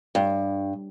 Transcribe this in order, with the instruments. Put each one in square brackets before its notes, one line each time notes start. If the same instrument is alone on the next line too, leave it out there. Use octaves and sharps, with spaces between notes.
[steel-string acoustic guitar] G2